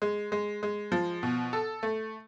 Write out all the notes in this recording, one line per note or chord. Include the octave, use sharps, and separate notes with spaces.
G#3
G#3
G#3
F3
B2
A4
A3